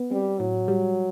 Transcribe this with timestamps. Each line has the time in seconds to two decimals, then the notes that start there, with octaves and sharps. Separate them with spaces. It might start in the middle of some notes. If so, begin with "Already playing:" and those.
Already playing: B3
0.11 G3 C4
0.40 A2 F#3
0.68 G3